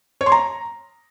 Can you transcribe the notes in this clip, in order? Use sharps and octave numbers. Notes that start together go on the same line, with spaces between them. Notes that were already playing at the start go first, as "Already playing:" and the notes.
C#5
C6
A#5